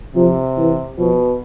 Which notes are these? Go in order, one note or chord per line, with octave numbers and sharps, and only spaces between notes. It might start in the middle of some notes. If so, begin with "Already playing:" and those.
C3 F3
E3
B2 F3